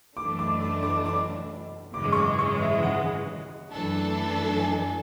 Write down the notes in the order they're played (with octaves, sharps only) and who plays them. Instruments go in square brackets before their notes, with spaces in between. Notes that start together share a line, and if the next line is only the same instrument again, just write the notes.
[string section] F#2 E3 A3 D4 [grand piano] D6
[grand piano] D6
D6
D6
D6
[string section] G#1 F#2 C#3 E3 G#3 [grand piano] D6
[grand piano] C#6
D6
C#6
E5
F#5
[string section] F#2 E3 A3 D4 A4
[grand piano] G#5